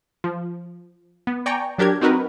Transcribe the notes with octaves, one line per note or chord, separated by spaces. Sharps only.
F3
B3
D5 G5 G#5 A#5 C#6
F#3 D4 G4 A#4 G#6
C4 D#4 F#4 A#4 B4